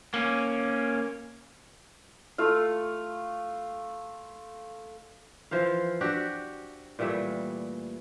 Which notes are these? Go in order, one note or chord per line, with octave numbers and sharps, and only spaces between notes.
A#3 C#4
A3 F4 F5
E3 F3 C5 F5
D4 F#4 G4 E5
A#2 E3 G3 A3